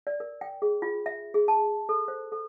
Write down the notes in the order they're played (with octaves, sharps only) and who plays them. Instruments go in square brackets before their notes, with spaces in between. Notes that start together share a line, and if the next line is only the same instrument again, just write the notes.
[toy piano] D5
A#4
G5
G#4
F4
E5
G#4
A5
A4
C5
A4